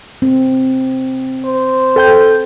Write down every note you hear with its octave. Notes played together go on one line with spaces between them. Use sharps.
C4
C5
A4 G5 G6